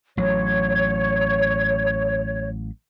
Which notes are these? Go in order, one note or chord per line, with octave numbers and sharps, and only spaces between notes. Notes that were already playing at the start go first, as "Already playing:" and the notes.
A1 F#3 C#5